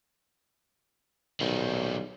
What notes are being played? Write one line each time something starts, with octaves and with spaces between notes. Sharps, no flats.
B1 D#3 G3